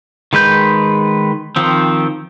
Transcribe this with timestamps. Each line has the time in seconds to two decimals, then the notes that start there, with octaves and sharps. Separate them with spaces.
0.33 D#3 G#3 B4 G6
1.56 D#3 F3 C4